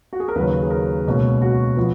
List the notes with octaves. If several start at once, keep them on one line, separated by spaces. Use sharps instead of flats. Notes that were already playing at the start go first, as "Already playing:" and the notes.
F#4
G#4
A#4
D#2 C#3 F#3 B4
G#4
A#4
C#2 B2 A#3 C#4
F#4
F3 B3